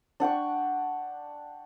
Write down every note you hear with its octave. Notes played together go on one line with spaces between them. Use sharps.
D4 F#5 G5 C#6